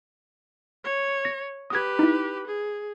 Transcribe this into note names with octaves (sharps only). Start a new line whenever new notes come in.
C#5
A#6
G4 B4 D#6 G#6
D#4 E4
G#4